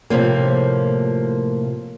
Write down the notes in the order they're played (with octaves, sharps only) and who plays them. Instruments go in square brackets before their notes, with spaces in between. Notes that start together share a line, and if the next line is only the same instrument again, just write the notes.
[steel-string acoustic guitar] A2 C3 F3 A#3